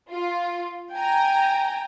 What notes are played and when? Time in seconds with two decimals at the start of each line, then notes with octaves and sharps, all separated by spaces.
0.11 F4
0.94 G5 G#5 A#5